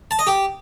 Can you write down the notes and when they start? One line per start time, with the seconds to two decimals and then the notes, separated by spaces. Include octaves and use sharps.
0.11 A5
0.19 D#5
0.27 G4